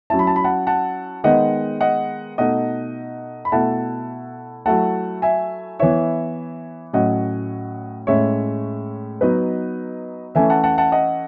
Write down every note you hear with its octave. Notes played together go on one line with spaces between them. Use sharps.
F#3 C#4 E4 A5
B5
A5
B5
F#5 A5
F#5 A5
D#3 G#3 B3 D#4 D#5 F#5
D#5 F#5
B2 A3 D#4 D#5 F#5
B5
B2 A3 E4 F#5 A5
F#3 A3 E4 F#5 A5
E5 G#5
E3 B3 E4 C#5 E5
A2 F#3 C#4 D#5 F#5
A2 G#3 C#4 C#5 E5
F#3 B3 D#4 B4 D#5
E3 A3 C#4 E5 G#5
F#5 A5
F#5 A5
F#5 A5
D#5 F#5